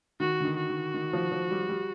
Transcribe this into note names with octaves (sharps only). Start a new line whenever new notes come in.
D#3 F#4
D3
D#3
F#4
D#3
D#3
F3
F3
G3
G3